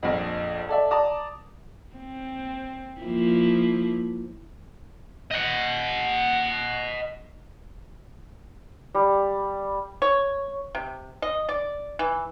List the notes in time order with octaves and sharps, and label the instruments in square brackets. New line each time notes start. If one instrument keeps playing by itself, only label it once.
[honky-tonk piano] A#1 F2
A4 D5 E5
D5 A5 A#5 D6 D#6
[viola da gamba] C4
F3 A#3 E4
[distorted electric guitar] D#5 F#5
[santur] G3
[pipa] C#5
C3
D#5
D5
E3